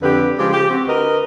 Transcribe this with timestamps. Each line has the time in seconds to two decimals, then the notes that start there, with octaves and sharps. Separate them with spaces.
0.02 F2 D3 G4 B4
0.39 C#3 F3 G#3 G4
0.53 G4
0.71 C4 F#4
0.88 D2 A#4 B4 D#5